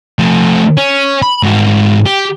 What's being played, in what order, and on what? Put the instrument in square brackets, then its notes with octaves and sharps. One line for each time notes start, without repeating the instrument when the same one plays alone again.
[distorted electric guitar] F3 A3
C#4
B5
G#2 F#4
G4